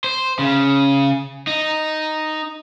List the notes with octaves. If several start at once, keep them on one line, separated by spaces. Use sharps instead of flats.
C5
C#3
D#4